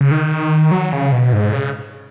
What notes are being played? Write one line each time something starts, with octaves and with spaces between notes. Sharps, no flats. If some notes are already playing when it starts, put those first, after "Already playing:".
C#3
D#3
F#3
C#3
B2
G#2
C#3